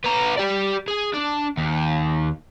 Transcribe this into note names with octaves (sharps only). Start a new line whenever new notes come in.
B3 A#5
G4 D5
G#4
D4
D#2